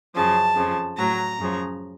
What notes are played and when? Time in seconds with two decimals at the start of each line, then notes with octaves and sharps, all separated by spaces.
0.15 F#2 C#3 F3 A5
0.56 F2 C#3 F3
0.98 A2 F#3 A#5
1.40 F#2 C#3 F3